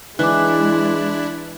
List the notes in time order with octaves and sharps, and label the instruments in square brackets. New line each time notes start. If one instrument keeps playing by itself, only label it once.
[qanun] E3 [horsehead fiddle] G#3 [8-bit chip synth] D4 E4 [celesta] D6 F#6